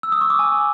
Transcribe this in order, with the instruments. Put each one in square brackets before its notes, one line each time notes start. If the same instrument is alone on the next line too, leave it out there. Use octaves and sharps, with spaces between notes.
[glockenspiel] E6
D#6
C#6
D6
G#5